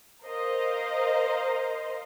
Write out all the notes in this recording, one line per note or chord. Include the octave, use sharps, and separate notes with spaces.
A#4 C5 D#5 F5